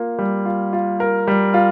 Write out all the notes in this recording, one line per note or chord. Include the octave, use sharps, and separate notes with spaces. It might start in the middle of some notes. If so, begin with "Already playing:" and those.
Already playing: A#3 F4
G3
F4
F4
A#4
G3
F4